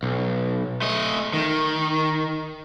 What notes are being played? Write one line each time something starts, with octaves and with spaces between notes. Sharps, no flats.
B1
A3 D#5
D#3